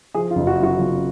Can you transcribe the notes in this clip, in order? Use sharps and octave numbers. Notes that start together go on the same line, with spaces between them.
F3 G#4
F4
F#1
F#4
F#2
F#4
F#1 F4